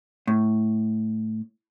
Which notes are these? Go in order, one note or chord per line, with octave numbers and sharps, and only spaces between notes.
A2